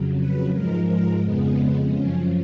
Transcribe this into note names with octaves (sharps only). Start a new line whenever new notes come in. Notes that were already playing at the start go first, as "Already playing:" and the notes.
Already playing: F2 C#3 F#3
B4
G#2 F3 G#3 A#4
A#4
F2 C#3 G#3 B3
F#2 C#3 F3 C#4